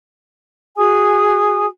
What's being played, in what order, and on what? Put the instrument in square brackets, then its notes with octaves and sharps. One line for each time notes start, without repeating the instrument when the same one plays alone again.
[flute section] F#4 G#4 G#5 D#6